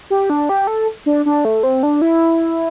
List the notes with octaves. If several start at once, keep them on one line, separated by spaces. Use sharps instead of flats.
G4
D4
G4
A4
D4
D4
A3
C4
D4
E4